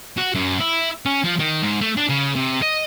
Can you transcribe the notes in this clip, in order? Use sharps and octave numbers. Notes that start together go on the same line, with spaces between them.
F#4
F#2
E4
C#4
F3
D#3
G#2
A3
D4
C#3
C3
D#5